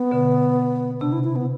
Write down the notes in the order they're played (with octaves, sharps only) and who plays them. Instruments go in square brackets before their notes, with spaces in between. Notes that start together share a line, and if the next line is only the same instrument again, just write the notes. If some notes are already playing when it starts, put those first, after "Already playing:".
Already playing: [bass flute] B3
[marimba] B2 D3
[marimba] C3 [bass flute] D4
[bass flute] E4
E4
B3